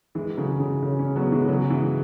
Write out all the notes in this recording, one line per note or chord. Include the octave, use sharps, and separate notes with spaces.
E3 G#3
C#3 F#3
C#3
C#3
G#3 C#4
F#3 B3
E3 G#3
C#3 F#3
E3 G#3